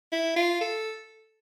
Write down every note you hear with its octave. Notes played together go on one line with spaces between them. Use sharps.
E4
F4
A4